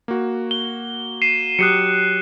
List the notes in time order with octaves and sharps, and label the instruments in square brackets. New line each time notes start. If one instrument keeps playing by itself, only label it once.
[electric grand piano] A#3 F#4
[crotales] G7
C7 D#7 E7
[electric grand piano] F#3 G4 D#6 [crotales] F#6 C7 C#7